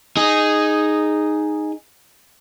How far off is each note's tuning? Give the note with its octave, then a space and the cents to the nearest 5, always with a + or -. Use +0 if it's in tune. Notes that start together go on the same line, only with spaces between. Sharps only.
D#4 -5 G#4 +0